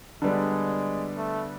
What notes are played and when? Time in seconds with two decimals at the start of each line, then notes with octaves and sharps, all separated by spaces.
0.22 D3 G3 G#3 B3 D4
1.17 A3